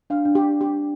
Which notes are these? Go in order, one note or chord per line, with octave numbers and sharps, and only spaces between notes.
D4 F5
D4
G4
G4